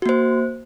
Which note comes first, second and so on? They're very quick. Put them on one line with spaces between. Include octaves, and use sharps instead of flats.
F#4 A#3 C5